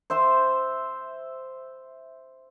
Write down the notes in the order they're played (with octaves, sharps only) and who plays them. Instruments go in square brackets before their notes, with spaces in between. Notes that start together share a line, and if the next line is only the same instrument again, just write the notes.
[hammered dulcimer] C5 E5 C6